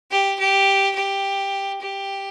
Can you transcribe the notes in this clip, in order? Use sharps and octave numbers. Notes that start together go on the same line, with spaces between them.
G4
G4
G4
G4